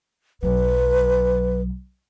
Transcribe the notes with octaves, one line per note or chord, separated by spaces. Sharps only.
B1 F#3 B4